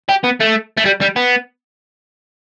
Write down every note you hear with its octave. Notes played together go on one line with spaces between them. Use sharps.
G4
B3
A3
A3
G3
G3
B3